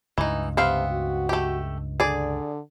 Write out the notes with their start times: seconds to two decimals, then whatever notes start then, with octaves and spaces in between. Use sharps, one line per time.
0.18 C#2 G2 E3 D#4
0.57 C3 B3 C4 F5
0.91 F#4
1.29 A3 G4
2.00 D3 G#4 D5